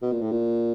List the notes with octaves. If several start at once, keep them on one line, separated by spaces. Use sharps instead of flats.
B2
A#2
A2
A#2